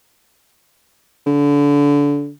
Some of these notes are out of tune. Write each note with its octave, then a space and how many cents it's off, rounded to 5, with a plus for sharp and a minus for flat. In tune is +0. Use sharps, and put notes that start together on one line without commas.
D3 -30